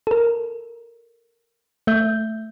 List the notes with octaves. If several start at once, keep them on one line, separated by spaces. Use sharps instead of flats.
A4 A#4
A3 E5 G6